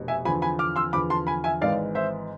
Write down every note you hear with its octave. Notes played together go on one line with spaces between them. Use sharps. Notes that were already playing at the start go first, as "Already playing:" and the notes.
Already playing: F1 B2
E5 G#5
E2 D3 F3 G#5 B5
G#5 B5
D6 F6
C6 E6
E2 D3 F3 B5 D6
A5 C6
G#5 B5
E5 G#5
G#1 G#2 E3 D5 F5
C5 E5